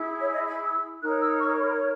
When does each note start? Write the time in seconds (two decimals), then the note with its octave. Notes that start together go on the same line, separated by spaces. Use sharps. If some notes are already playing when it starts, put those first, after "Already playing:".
Already playing: E4 G#4
0.19 C#5
0.32 D#5
0.46 B5
0.64 E6
1.01 D#4 A#4 C#5 F#6
1.19 E6
1.38 C#6
1.52 C#6
1.57 B5